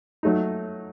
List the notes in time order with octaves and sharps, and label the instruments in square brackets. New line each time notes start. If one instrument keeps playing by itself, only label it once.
[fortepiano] F#3 A3 D#4